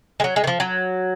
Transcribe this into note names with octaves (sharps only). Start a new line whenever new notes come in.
G#3
F#3
G#3
D#3
F3
F#3